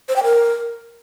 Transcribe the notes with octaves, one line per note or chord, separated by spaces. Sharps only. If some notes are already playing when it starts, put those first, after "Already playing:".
C5
G5
A#4